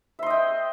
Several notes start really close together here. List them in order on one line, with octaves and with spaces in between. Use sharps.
E5 C6 D#5 G5